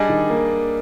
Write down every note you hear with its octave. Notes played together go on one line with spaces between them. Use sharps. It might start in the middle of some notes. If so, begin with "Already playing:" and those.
Already playing: G3 D4 G#4 D#5
D#3
A#3